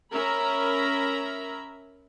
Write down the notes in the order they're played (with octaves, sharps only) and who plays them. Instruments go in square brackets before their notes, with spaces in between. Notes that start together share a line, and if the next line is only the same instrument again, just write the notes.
[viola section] C#4 A#4 E5 A#5 B5